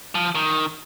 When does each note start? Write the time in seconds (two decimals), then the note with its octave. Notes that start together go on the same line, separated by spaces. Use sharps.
0.15 F3
0.35 D#3